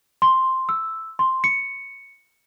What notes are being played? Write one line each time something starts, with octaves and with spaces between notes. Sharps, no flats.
C6
E6
C6
C#7